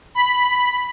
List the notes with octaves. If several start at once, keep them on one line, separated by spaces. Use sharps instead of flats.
B5